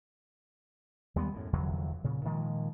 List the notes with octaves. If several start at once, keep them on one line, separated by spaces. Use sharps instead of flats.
D#2 G3 G#3 B3
F#2 A2
F1 E2 D3 F#3
A#2 C#3
A#2 D#3 F3 G#3